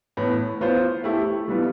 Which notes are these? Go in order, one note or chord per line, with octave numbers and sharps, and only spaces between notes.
A2 E3 B3
E3 B3 F4 C5
A3 E4 G4
E3 G3 B3 F4